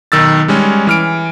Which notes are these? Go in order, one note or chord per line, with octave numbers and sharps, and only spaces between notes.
B1 D#3 E6 A6
G3 G#3 C#4
E3 F6 D7